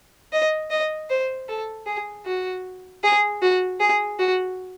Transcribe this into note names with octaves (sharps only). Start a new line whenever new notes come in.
D#5
D#5
C5
A4
G#4
F#4
G#4
F#4
G#4
F#4